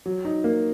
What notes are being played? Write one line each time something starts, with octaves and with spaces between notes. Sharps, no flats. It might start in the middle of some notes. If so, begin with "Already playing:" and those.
F#3
D#4
A#3